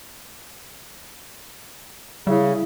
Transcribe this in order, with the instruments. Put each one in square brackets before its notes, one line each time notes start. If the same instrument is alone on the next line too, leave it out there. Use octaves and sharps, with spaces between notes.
[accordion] C#3 [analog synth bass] G3 [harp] E4 E5